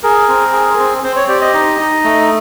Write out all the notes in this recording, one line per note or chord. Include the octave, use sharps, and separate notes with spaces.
G#4 A#4
C4
G#4
C4
C4 C5
C#5
G4 D5
D#5
D#4
D#4
A3